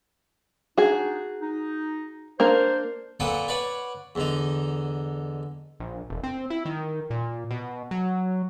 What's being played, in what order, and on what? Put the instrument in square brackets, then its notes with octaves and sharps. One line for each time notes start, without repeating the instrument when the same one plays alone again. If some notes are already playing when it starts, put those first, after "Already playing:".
[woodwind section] D4 D#4 [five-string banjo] F#4 G#4
[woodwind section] D#4
[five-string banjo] A#3 D4 A#4 [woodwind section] C5
[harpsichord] A#2 A4 B4 F#5 G5 D#6
B4 C#5 D5 F#5 B5
E2 D3 D#4
[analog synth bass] A#1
E1
C4
E4
D#3
A#2
B2
F#3